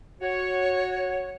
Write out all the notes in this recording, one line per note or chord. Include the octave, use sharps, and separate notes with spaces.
F#4 C#5